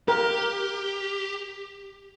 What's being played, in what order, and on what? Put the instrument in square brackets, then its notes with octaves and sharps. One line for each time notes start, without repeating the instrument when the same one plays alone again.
[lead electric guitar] G4 [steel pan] A#4